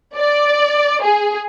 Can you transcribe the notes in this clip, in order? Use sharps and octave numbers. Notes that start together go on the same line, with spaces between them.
D5
G#4